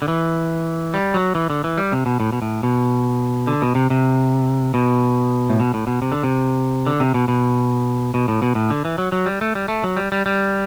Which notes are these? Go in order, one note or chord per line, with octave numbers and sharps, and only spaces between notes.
D3
E3
G3
F#3
E3
D3
E3
G3
C3
B2
A2
B2
A2
B2
D3
B2
C3
C3
B2
A2
B2
A2
B2
C3
D3
C3
D3
C3
B2
B2
B2
A2
B2
A2
D3
E3
F#3
F#3
G3
A3
G3
A3
F#3
G3
G3
G3